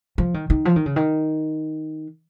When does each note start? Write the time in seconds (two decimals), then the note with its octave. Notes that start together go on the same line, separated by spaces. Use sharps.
0.18 F3
0.34 D#3
0.50 D#3
0.65 F3
0.76 D#3
0.86 C#3
0.96 D#3